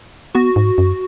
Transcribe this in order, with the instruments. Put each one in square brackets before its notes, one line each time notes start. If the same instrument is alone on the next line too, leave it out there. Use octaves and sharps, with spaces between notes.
[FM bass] B3 [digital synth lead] F#4
[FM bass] G#2
F#2